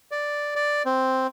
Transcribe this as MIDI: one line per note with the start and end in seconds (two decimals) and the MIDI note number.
0.11 0.55 74
0.56 0.83 74
0.86 1.27 60